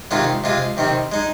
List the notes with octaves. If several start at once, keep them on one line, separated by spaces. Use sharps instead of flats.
C3 D#3 G#3 F4
C3 G#3 F4
C3 D#3 C4
G#3 D#4